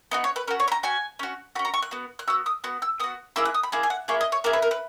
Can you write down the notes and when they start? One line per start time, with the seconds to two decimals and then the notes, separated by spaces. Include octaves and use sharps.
0.11 B3 D#4 F#4 D#5
0.24 C#5
0.36 B4
0.48 C#4 A#4
0.51 F#4
0.60 C#5
0.68 B5
0.72 A#5
0.83 C#4 F#4 G#5
1.19 C#4 F#4
1.55 F#4 B5
1.59 C#4
1.65 A#5
1.74 C#6
1.82 F#6
1.91 B3 F#4
2.19 F#6
2.28 B3 F#4 E6
2.46 D#6
2.64 B3 F#4 F#6
2.82 E6
3.00 B3 F#4 D#6
3.36 A#3 E4 G#4 E6
3.45 F#6
3.54 D#6
3.63 B5
3.72 A#3 E4 G#4
3.83 G#5
3.90 F#5
4.08 A#3 E4 G#4 C#5
4.21 D#5
4.32 C#5
4.44 A#3 E4 G#4 A#4
4.53 B4
4.62 A#4
4.71 B4